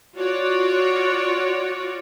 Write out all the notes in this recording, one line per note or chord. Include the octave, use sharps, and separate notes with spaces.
F4 F#4 C#5 D5